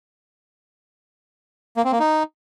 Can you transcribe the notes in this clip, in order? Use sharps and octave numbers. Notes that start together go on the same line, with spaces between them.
A#3
C4
A#3
D#4